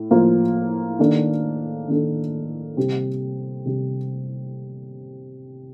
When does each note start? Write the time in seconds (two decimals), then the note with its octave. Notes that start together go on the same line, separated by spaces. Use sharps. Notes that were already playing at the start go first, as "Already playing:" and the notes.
Already playing: A2
0.10 A2 F3 A#3 F4 C5
0.99 D#3 A#3 D4 A4
1.88 D#3 A#3 D4 A4
2.77 C3 G3 C4 G4
3.66 C3 G3